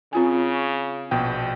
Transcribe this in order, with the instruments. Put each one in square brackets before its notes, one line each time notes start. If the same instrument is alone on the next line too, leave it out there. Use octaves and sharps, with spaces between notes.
[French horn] C#3 [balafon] C4 F4 G#5
[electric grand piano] A#1 B2 G5